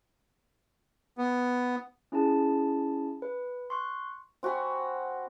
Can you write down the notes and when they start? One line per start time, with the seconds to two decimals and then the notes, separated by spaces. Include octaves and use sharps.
1.18 B3
2.12 C#4 E4 G#4 A5
3.22 B4
3.70 C6 C#6 F#6
4.43 C4 F#4 G#5 B5